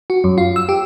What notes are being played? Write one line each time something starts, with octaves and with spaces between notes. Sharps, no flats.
F#4
F#2
F4
E6
G4